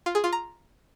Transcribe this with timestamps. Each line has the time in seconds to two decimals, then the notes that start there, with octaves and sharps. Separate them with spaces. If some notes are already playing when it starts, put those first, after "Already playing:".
0.06 F4
0.15 G#4
0.24 F4
0.33 A#5